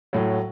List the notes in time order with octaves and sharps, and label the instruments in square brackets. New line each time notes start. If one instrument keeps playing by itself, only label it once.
[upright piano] A2 F#3